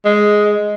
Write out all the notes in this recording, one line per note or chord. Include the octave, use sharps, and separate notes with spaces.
G#3